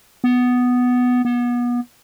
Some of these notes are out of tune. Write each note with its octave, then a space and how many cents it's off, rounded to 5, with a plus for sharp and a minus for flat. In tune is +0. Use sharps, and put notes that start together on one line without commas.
B3 +5
B3 -30